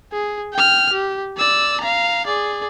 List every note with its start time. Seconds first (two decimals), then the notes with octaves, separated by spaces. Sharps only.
0.12 G#4
0.53 G5 F6
0.92 G4
1.37 D5 E6
1.81 F5 A#5
2.26 G#4 D5